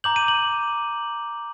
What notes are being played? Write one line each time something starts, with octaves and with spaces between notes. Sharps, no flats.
A#5 D6 G6 F#7
D#7
F#7